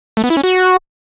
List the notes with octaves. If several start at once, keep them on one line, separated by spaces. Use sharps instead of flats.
A3
B3
E4
C#4
F#4